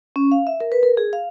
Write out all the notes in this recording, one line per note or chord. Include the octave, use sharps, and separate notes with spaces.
C#4
F5
E5
A#4
B4
A#4
G#4
F5